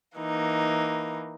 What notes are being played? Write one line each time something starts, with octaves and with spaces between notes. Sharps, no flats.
E3 A#3 D#4